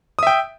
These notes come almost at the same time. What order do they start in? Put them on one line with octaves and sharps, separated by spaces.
D#6 E5 G5